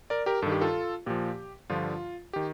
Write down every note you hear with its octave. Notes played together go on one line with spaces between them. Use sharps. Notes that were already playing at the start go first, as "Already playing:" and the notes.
A#4 D5
G4 A#4
G2 D#3 A4
G4
F4 A4
A#2 F3 G4
G2 D3 F3 F4
D#3 G4